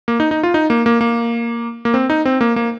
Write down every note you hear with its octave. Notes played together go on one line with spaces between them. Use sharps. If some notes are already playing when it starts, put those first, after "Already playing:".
A#3
D#4
D#4
F4
D#4
A#3
A#3
A#3
A#3
C4
D#4
C4
A#3
A#3